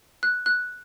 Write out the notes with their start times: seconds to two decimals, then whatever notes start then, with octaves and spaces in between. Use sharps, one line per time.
0.23 F#6
0.46 F#6